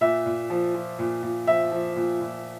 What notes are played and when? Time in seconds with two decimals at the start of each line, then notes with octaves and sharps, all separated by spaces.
0.01 A#2 E5
0.26 A#2
0.50 F3
0.75 F3
0.99 A#2
1.23 A#2
1.47 F3 E5
1.72 F3
1.96 A#2
2.20 A#2